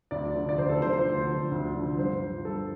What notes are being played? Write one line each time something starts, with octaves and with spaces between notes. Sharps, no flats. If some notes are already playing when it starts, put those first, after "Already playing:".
D2 D5
D3 F3
D5
D2 C5
A4
D3 F3 C5
C5
D2
D3 F3
D2
D3 F3
G2 C5
F3
G2 A4